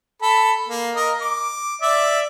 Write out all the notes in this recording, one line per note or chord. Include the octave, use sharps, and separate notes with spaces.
A4 B5
A#3
A#4 D#5
D6
D5 E5